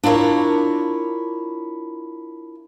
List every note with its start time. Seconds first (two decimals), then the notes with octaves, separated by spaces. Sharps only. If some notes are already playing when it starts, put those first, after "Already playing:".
0.03 D4 E4 F4 A#4 C#5